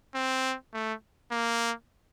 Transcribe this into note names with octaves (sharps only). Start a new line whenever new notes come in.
C4
A3
A#3